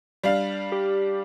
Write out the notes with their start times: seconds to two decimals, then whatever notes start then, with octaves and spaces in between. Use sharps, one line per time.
0.23 G3 D4 F5
0.72 G4